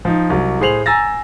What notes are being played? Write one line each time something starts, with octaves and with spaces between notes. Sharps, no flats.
F3 D#4
C2 F#3
A2 G#4 C5 C7 F7 F#7
G#5 A#5 E6 A6 A#6